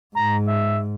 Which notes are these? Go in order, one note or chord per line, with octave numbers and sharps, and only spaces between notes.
G#2 A#5
E5